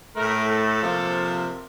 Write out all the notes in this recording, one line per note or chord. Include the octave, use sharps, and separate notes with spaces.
A2 A3 A#4
A4
C3 F3 A#3